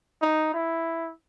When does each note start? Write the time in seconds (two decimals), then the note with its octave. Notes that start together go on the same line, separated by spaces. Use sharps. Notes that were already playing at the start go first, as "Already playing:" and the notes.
0.22 D#4
0.54 E4